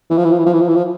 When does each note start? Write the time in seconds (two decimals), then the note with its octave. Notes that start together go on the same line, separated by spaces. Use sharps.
0.10 E3
0.17 F3
0.25 E3
0.32 F3
0.39 E3
0.46 F3
0.53 E3
0.61 F3
0.68 E3
0.76 F3